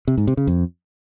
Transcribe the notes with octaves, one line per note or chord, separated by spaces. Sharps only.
C3
G#2
C3
C#3
F2